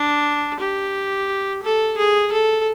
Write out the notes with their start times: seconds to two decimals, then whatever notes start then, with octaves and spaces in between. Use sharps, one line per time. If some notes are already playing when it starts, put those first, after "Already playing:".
Already playing: D4
0.59 G4
1.63 A4
1.97 G#4
2.32 A4